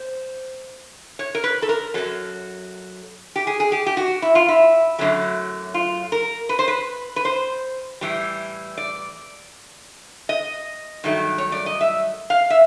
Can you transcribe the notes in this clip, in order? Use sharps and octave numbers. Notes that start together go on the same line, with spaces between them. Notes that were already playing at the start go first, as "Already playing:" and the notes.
Already playing: C5
C#5
A#4
B4
A4
A#4
F#2 C#3 F#3 A4
G4
G#4
G#4
G4
G4
F#4
E4
F4
E4
F#2 D3 F#3 A3
F4
A#4
B4
C5
B4
B4
C5
A2 E3 G3
D5
D#5
G2 D#3 F#3 A3
C#5
D5
D#5
E5
F5
E5